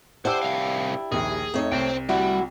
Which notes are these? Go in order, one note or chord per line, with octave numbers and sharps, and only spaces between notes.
D4 E4 G4 C5 F#5 E6
C2 F5
A#1 D#2 G#4
F2 A3 D#4 C#5
C2 C5 G5
D2 G3 E4 F#4